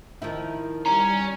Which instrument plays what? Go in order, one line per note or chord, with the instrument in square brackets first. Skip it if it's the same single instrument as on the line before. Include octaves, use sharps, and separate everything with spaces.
[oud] D#3 F3 E4
[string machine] G3 [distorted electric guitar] C#4 [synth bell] A#5